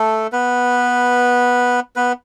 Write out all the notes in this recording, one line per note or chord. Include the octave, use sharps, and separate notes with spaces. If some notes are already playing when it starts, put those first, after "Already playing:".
Already playing: A3 A4
B3 B4
B3 B4